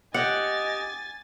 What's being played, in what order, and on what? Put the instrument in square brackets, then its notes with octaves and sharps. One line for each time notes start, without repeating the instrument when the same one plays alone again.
[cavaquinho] G4 [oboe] D#5 [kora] F#5 [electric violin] G#5 A6